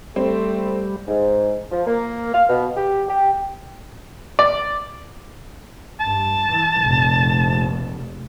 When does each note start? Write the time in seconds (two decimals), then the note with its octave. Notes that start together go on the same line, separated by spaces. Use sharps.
0.16 G3 A3 C4
1.08 G#2
1.71 F3
1.87 A#3
2.33 F5
2.49 B2
2.77 G4
3.08 G4
4.39 D5
6.01 G2 A5
6.50 E3
6.79 F1 A#1